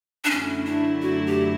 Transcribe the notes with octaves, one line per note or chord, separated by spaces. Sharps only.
D4
F#2 D3 F#3 A3 C#4 E4
D4
F#4
G4